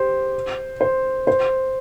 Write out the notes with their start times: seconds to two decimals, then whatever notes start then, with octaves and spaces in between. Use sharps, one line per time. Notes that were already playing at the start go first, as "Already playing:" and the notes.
Already playing: G4 C5
0.81 C5
1.27 C5